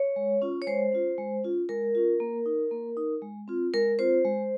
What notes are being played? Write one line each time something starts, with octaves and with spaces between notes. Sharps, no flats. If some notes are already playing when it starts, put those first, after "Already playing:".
Already playing: C#5
G#3
C#4 F4
C#5
G#3 C5
C#4 F4
G#3
C#4 F4
G#3 A#4
C#4 F4
A#3
D#4
A#3
D#4
G#3
C4 F4
G#3 A#4
C4 F4 C5
G#3